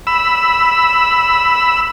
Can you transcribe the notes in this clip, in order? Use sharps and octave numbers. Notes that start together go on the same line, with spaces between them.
B5 E6